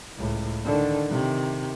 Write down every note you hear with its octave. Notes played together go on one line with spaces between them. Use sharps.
C#2 A2
D3 D#3
C3 D#3